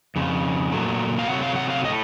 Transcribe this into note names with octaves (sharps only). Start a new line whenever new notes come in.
F2 C#3
A#2 F#3 A3
F5
C3 F#3 A3 F#5
F5
F#5
F5
A2 D#5
A3